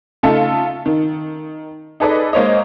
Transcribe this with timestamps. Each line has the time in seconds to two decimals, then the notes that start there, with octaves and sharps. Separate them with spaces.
0.23 C#3 A3 D#4 F4 A4
0.86 D#3
2.00 D#4 G#4 A4 B4 D5 D#5
2.33 G#3 A#3 C5 C#5 D#5